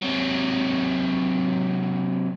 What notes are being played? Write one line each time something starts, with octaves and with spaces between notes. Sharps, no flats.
C3 F#3